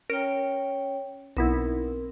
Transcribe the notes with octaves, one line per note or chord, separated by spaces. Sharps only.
C#4 A#4 C#5 G5 D7
B1 B3 C4 E4 A#4